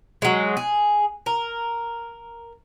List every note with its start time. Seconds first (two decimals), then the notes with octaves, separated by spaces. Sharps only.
0.22 F#3 G#3
0.57 G#4
1.26 A#4